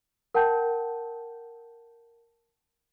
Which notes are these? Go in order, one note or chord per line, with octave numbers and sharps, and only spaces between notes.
A#4 F#5 G5 A5 G6